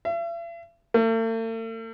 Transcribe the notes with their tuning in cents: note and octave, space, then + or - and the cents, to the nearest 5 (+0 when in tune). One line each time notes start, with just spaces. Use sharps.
E5 +45
A3 +45